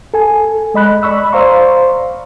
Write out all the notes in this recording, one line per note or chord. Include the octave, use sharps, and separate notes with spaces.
A4 G#5
G#3 D#5 B5 F#6
D5 B5 C#6 E6
C5 D5 F5 A#5 C6 C#6